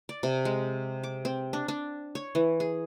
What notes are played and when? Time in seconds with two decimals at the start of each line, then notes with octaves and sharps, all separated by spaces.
0.09 D5
0.23 C3
0.45 G#3
1.04 D6
1.25 C4
1.53 D4
1.68 D4
2.15 C#5
2.35 E3
2.60 G#4